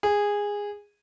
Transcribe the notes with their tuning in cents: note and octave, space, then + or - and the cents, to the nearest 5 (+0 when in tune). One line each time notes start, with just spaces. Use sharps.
G#4 -15